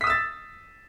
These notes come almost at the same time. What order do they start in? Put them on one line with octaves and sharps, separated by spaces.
B6 D#6 E6 A6